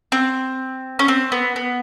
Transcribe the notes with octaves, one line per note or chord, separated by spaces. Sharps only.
C4
C#4
C4
B3
B3